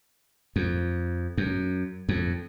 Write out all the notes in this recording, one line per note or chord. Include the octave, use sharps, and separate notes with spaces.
F2
F#2
F2